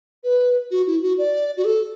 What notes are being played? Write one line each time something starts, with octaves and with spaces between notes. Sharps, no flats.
B4
F#4
E4
F#4
D5
F#4
A4